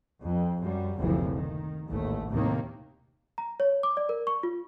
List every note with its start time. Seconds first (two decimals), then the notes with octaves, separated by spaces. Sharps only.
0.23 F2
0.63 F#2 G3
0.98 F#1 D2 C3 E3 F3
1.34 D#3
1.89 A1 D#2 G#2 A3
2.29 D#2 A2 C3 D#3 A#3
3.38 A#5
3.60 C#5
3.83 D6
3.97 D5
4.09 A#4
4.27 C#6
4.43 F4